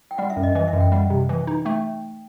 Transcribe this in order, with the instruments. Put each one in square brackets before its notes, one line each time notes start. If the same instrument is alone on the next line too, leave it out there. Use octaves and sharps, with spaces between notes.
[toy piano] G5
[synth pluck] G3 [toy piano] F#5
[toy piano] E5
[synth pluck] F#2
[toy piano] D#5
[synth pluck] E3 [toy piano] D#5
[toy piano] E5
[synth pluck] F#2
[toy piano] G5
[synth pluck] G3 [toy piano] F#5
[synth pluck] C3
E3
D#4
[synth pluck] A3 [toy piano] G5